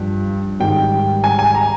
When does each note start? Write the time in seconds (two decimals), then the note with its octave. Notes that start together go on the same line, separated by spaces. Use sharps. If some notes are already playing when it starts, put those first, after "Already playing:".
Already playing: G2 F3
0.60 G#2 D#3 G3 G5
1.24 G#5
1.39 G#5
1.55 A#5